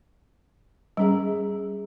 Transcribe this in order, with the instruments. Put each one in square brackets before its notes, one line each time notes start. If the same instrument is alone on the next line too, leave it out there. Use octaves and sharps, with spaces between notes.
[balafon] G3 C#4 G#4